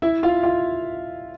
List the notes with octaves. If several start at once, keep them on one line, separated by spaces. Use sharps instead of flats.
E4 E5
F4 F5
F4 F5